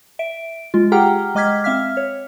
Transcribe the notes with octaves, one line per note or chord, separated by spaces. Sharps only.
E5 D7
G#3 F4
G4 G#4 F#5 G5 A#5 F6
G#3 D#5 D6 F6 G#6 B6
C4 E5 F5 F6 B6
C#5